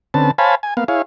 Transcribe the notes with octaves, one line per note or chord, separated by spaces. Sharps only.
D3 C4 C#4 B4 A5
C5 C#5 F5 G#5 A5 B5
G#5
A#3 B3 F5
E4 G#4 C#5 F5